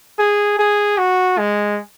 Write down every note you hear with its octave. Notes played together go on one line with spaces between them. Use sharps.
G#4
G#4
F#4
G#3